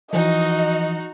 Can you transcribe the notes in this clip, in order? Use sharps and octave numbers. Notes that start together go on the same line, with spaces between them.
E3 F3 D#4 F#4 D#5